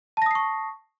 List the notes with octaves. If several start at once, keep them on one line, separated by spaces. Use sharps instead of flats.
A5 C#6 D#6 A#6 C7